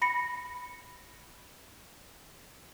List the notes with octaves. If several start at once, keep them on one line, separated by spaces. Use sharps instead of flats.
B5 A#6 C#7